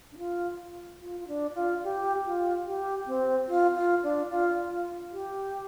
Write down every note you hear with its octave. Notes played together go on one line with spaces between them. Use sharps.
D4
F4
F4
F4
D4
F4
G4
F4
G4
C4
F4
F4
D4
F4
G4